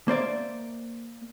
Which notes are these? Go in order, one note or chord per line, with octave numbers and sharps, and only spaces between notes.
A#3 C5 D5 E5